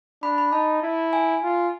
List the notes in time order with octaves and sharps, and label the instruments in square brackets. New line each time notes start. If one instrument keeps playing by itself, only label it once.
[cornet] D4 [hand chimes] B5
[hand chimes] B5
[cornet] D#4 [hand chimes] A5
[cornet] E4
[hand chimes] G#5
[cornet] F4